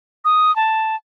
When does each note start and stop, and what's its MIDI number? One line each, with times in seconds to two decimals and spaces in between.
0.25 0.54 87
0.56 0.96 81